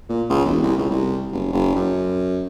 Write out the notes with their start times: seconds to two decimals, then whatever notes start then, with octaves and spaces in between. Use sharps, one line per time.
0.09 A#2
0.30 C#2
0.46 E1
0.62 C2
0.78 C#2
0.90 C2
1.33 F#1
1.53 F#1
1.76 F#2